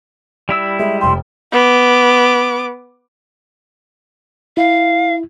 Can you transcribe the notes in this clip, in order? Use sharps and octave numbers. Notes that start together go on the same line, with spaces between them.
G3 E4 E6
G#3 E5
F1 G5 C6
B3 D6
E4 F5